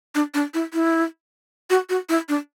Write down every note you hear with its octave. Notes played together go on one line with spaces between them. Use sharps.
D4
D4
E4
E4
F#4
F#4
E4
D4